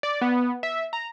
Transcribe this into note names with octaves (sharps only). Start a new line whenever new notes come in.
D5
B3
E5
A#5